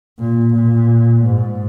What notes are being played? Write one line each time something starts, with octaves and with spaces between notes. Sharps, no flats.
A#2
A#2
G#2